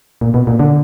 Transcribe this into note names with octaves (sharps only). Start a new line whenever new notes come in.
A#2
B2
A#2
D3